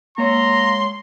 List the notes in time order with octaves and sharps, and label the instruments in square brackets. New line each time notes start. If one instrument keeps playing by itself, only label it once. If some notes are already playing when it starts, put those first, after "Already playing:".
[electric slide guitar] G#3 C#5 [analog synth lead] A#3 [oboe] A#5 [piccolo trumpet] C6